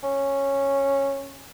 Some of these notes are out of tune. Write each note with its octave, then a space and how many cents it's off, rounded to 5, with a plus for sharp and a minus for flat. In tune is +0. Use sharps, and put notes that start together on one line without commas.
C#4 -10